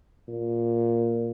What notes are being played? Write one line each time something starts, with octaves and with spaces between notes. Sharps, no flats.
A#2